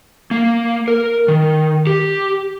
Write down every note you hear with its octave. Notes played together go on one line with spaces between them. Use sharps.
A#3
A#4
D#3
G4